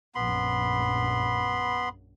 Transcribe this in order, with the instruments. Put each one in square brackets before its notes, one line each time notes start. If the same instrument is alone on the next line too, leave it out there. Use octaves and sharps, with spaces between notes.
[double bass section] A#1 F#2 [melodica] B3 B5 C6